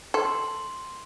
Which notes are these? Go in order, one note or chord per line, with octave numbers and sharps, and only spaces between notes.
A4 C6